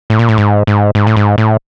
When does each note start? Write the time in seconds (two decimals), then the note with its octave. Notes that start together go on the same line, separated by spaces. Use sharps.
0.10 A2
0.19 A#2
0.29 A2
0.38 G#2
0.67 G#2
0.95 G#2
1.07 A2
1.17 G#2
1.38 A2